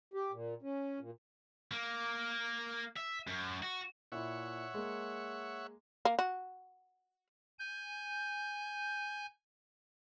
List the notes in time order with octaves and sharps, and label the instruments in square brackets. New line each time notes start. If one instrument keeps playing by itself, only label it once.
[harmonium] G4
A#2
C#4
A#2
[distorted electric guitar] A#3
E5
F#2
F#4
[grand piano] A#2 E4 [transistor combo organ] C#5 E5 F#5
[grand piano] G#3 A#3
[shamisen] A#3
F#4
[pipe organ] G#5 G6